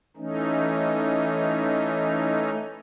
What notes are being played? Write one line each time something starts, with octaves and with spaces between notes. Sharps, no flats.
E3 A3 C#4 D#4